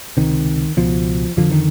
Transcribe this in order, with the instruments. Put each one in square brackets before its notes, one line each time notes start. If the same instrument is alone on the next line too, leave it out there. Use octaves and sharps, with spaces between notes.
[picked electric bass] C#2 C3 D#3
C#2 B2 F3
F2 D3 F3
D#3